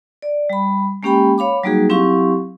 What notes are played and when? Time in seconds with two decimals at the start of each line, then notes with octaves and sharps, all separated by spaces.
0.22 D5
0.50 G3 B5
1.03 G#3 A#3 C#4 G4 G5 B5
1.38 C#5 F5 B5 D6
1.63 F#3 G3 A#3 D#4 F#4 G#4
1.89 F#3 C4 E4 G4 F5 C#6